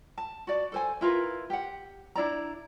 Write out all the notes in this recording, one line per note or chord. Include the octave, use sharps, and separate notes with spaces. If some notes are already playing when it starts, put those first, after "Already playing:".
A5
F#4 D5
A4 C5 G#5
E4 F4 A#4 B4
G4 F#5
D4 E4 D5 A#5